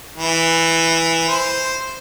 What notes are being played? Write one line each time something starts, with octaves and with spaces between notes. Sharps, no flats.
E3
C5